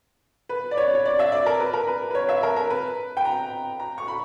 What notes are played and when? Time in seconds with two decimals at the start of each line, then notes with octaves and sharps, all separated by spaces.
0.49 B4
0.71 D5
0.77 C#5
0.95 C#5
1.05 D5
1.19 E5
1.32 D5
1.46 A#4
1.60 B4
1.73 A#4
1.87 B4
2.11 B4
2.15 C#5
2.28 E5
2.43 A#4
2.56 A#4
2.70 B4
3.17 G5
3.25 A#5
3.80 A#5
3.98 C#6
4.08 B5